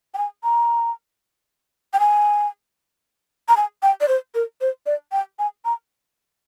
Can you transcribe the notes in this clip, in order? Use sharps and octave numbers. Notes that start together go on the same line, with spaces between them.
G5
G#5
A#5
G5
G#5
A#5
G#5
G5
D5
C5
A#4
C5
D5
G5
G#5
A#5